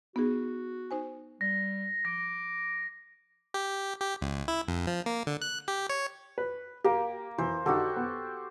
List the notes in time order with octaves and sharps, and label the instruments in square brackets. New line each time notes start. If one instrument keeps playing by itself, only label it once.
[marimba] B3 D#4 G#4 [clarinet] F#4
[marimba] D#4 C5 G#5
[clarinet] G3 [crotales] A#6
[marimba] F3 [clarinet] D6 [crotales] A#6
[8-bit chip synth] G4
G4
C#2
E4
F2
F3
A#3
D3
F#6
G4
C#5
[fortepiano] B4
[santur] A#3 [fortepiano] G4
[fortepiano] E3 [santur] C5
[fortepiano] D3 D#4 [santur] F#4 G4 A4
[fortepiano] B3